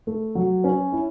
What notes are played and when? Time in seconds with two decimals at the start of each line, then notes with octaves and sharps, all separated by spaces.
0.07 A3
0.35 F#3
0.64 C#4
0.92 E4